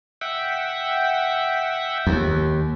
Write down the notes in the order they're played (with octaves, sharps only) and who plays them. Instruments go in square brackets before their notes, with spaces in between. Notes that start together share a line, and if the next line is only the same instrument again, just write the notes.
[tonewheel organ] E5 F#5 G5
[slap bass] D#2